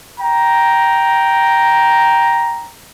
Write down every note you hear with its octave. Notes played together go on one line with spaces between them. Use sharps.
G5 A#5